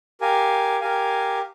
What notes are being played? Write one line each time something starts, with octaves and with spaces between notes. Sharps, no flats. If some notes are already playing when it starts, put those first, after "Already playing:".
G4 A#4 F5 G#5
G4 A#4 F5 G#5